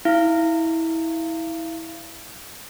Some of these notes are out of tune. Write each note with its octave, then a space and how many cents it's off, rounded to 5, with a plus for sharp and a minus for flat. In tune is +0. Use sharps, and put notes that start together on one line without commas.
E4 -20 F5 -35